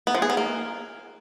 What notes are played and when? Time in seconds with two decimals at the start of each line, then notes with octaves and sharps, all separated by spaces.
0.07 B3
0.15 F3
0.22 G#4
0.30 B3
0.37 A#3